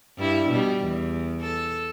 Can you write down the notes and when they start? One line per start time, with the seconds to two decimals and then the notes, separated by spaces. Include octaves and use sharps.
0.18 G2 E4
0.50 B2 G3
0.80 E2
1.41 A4